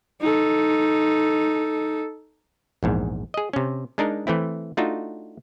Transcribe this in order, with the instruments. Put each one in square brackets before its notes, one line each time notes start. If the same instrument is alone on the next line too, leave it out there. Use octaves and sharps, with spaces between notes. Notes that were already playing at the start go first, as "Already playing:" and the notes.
[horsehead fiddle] D#4 A4
[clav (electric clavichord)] A#1 E2 G#2
G#4 D#5
C3 C#4
G#3 D4 D#4 A#4
E3 A3 C4 E4
A3 D4 D#4 F4 F#4